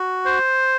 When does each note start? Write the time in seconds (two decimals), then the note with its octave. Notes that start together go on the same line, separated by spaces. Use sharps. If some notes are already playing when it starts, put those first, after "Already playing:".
Already playing: F#4
0.25 C5